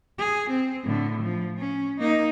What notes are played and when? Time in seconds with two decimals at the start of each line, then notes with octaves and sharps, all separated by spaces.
0.18 G#4
0.50 C4
0.85 A2 D3
1.22 F3
1.58 C#4
2.00 A#3 D#4